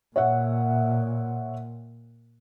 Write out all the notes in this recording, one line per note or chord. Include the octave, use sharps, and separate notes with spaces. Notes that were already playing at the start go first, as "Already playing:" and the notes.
A#2 C#5 E5 F#5